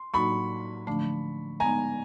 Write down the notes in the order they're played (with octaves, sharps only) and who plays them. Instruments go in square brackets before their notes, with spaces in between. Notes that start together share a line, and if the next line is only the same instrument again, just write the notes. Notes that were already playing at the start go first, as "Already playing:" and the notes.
Already playing: [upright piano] C6
[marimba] A2 F#3 A#3 D#4 F#4 [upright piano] B5 C#6
[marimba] D3 F3 A3 D4
[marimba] G#3 B3 D#4 [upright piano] G#5 A#5